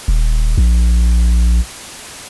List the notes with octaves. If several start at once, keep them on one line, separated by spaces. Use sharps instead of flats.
D#1
A#1